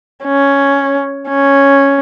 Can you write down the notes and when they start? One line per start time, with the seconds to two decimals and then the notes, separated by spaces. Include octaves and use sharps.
0.24 C#4
1.29 C#4